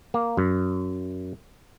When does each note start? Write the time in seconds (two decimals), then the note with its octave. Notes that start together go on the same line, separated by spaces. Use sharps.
0.14 A#3
0.37 F#2